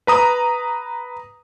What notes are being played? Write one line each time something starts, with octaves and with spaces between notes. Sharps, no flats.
B4 A#5 D#6